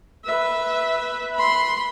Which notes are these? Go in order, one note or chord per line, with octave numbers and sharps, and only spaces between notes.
B4 E5
B5 C6